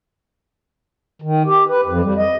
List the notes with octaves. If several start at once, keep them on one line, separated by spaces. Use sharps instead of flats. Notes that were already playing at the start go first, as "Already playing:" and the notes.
D#3
G4
B4
F2
G3
D#5